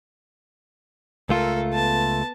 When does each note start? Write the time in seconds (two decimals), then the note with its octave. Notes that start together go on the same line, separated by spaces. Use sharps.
1.29 C#2 A3 F4 A4 A#4
1.73 B3 A5